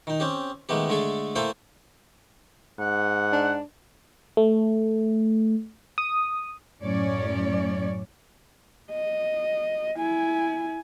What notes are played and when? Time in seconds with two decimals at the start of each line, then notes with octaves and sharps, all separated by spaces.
0.07 D#3 D#4
0.20 C4 C#4 G4
0.69 D#3 G#3 A3 B3 G4
0.89 D3 G#3 A3 G#4 A4
1.35 A3 A#3 E4 A4 C5 G5
2.79 G#2 F#5
3.32 D4
4.37 A3
5.98 D#6
6.83 F#2 A2 C#4 C#5 D5
8.91 D#5
9.98 E4 G#5